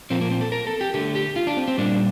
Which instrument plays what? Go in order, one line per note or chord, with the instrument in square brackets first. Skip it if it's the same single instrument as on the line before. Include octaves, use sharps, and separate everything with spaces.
[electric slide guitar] A#2 F3 A#3 C4
A#3
C4
A4
A#4
A4
G4
D3 A3 G4
G4
F4
D4
C4
C4
A#2 G3 A#3 D4